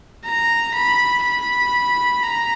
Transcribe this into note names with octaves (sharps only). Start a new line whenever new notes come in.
A#5
B5
B5
A#5